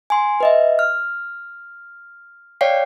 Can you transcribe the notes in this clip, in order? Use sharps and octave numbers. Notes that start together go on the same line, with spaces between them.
G#5 C6
B4 D#5 E5
F6
C#5 D5 F5 G5 C7